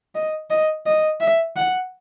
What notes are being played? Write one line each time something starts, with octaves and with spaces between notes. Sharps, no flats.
D#5
D#5
D#5
E5
F#5